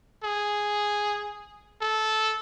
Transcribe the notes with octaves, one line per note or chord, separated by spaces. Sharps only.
G#4
A4